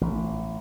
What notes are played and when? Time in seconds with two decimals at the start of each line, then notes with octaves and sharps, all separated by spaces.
0.01 A1